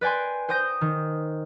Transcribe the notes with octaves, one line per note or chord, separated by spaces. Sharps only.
B4 D5 G5 G#5 C6
C5 G5 D#6 G6 A#6
D#3